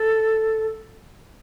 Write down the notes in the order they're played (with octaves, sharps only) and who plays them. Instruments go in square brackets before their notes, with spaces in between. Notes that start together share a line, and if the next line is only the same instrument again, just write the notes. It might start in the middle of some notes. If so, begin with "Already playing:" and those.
Already playing: [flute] A4